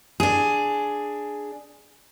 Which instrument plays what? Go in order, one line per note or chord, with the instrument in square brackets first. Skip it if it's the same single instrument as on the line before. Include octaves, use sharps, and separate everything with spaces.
[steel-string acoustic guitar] D4 G#4